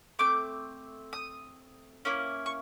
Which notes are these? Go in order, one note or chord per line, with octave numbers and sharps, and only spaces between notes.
A3 C4 D6
D#6
A#3 C#4 E4
C#6